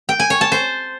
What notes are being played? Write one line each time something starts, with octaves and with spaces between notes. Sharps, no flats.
G5
G#5
C#5
A5
C5